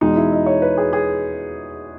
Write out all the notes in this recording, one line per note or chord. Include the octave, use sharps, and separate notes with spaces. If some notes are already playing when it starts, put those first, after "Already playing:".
E2 B2 G#3 D#4
E4
D#5
C#5
B4
G#4
G#4